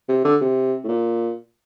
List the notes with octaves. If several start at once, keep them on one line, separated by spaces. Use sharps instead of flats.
C3
D3
C3
A2
A#2